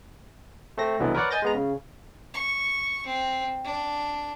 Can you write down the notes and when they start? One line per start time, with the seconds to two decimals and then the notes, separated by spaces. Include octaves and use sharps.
0.78 A3 C4 A#6
0.99 C2 B2 D3 E3 F#3 B3
1.15 A#4 B4 C#5 D5 F#5
1.31 D#5 G#5 G6 A6 A#6
1.42 G#3 B3 A#5
1.55 C#3
2.34 C#6
3.06 C4
3.64 D4